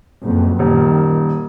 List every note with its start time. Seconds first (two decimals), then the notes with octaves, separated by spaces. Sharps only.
0.24 F#1 F2 B2
0.59 D#1 A#2 D#3